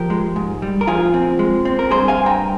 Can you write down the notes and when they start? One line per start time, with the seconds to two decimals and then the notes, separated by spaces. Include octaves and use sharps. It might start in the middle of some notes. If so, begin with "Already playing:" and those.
Already playing: F3 G4 A#4
0.10 G#3
0.36 G#2
0.62 G3
0.81 A#4
0.87 F3 F4 G#4
1.14 C4
1.39 G#3
1.65 C4
1.79 A#4
1.91 G2 G#4 C5
2.08 F5 G#5
2.18 G2
2.26 G5 A#5